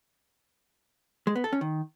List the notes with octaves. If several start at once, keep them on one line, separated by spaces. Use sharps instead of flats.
G#3
B3
A4
C#4
D#3